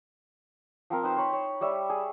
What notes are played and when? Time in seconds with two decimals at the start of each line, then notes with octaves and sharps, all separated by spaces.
0.90 F3 C4 A#4
1.03 D#4 B4 C5
1.16 C5 C#5 B5
1.33 C#5
1.61 G3 C#5 E5
1.89 G#4